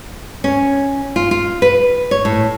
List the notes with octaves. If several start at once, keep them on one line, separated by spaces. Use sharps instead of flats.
C#4
F4
F4
B4
C#5
A2